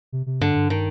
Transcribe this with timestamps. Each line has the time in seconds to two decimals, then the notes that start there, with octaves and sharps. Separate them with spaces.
0.12 C3
0.26 C3
0.41 G2 D3
0.55 G2
0.70 D#3